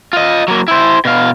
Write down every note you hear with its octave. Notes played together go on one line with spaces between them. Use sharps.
F4 D#5
F#3 A#3
E4 C5
B2 F5